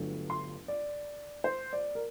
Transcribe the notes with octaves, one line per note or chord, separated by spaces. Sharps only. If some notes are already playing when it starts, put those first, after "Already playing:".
Already playing: G1 G2 F#3 A3
C6
D5
C5
D5
A#4